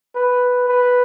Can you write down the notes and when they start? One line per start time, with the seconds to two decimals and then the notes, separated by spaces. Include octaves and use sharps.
0.16 B4
0.68 B4